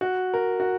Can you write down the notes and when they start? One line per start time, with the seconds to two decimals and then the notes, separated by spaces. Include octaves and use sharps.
0.01 F#4
0.34 A#4
0.60 F#4